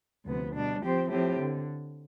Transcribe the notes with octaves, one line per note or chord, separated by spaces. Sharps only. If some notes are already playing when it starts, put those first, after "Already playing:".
D2 C3 F3 B3
B2 G3 D4
F3 C4 G4 C5
A2 F3 C4 G4
D3